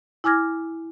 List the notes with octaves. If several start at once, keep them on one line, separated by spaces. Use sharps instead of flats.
E4 G#5 D6 F6 G#6 A#6